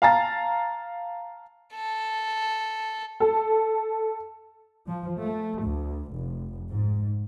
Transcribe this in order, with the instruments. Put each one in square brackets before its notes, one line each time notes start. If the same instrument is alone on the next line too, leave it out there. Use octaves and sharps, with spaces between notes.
[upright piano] F5 A5 A#5 A6
[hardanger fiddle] A4
[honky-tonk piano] A4
[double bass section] F3
A3
D2
F1
G#2